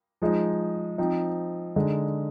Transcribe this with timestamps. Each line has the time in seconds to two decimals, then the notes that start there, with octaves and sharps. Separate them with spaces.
0.22 F3 G#3 D#4
0.98 F3 C4 D#4
1.76 D3 G#3 D#4